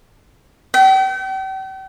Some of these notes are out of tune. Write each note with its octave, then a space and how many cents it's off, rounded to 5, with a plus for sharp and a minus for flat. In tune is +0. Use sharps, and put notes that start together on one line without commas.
G5 -40